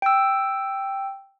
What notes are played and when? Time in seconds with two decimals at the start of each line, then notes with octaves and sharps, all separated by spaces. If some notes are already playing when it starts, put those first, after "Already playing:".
0.02 G5 E6